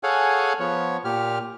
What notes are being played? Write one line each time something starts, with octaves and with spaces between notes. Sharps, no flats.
G#4 A4 C#5 F5 F#5 G#5
F3 B3 C#5
A#2 G4 F6